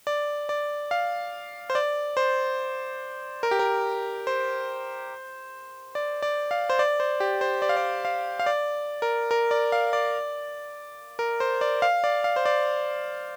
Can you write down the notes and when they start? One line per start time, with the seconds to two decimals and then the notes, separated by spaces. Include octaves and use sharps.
0.07 D5
0.49 D5
0.91 F5
1.70 C5
1.75 D5
2.17 C5
3.43 A#4
3.51 G4
3.59 A#4
4.27 C5
5.95 D5
6.22 D5
6.51 F5
6.70 C5
6.79 D5
7.00 C5
7.20 G4
7.41 C5
7.62 D5
7.69 F5
7.77 D5
8.05 F5
8.40 F5
8.46 D5
9.02 A#4
9.31 A#4
9.51 D5
9.72 F5
9.93 D5
11.19 A#4
11.40 C5
11.61 D5
11.82 F5
12.04 D5
12.24 F5
12.36 C5
12.45 D5